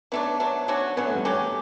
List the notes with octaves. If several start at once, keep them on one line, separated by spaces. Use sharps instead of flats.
F#3 A3 B3 D4
F#3 A3 D4
D3 F#3 C#4 F#4
D3 F#3 B3 C#4 F#4
A3
G3
F#3 A3 C#4 G4